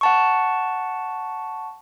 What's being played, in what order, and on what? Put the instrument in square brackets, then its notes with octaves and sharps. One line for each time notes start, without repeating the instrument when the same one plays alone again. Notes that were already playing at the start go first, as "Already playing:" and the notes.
[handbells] F#5 A5 C#6